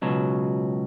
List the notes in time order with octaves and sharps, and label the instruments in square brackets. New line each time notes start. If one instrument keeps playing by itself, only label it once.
[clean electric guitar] C#2 B2 F#3